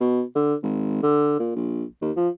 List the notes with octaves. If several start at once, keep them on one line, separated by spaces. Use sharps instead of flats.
B2
D3
G#1
D3
A#2
A#1
D#2
F3